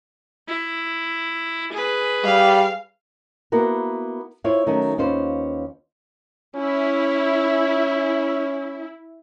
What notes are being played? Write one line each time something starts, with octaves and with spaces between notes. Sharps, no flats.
E4
G#4 B4
G3 F5
A#3 B3 E4 F#4 A#4
E4 F4 C5 C#5
D#3 F#3 A3 C#4
D#2 C#4 F4 B4 C5
C#4 E4